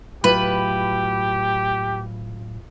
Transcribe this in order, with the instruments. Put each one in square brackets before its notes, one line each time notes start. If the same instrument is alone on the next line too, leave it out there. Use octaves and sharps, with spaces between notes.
[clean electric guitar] A2 F#3 F4 [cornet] G4 [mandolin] B4